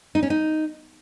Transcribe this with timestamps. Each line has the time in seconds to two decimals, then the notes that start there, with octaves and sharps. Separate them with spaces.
0.15 D#4
0.23 C#4
0.30 D#4